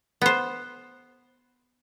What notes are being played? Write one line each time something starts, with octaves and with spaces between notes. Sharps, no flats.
B3 C5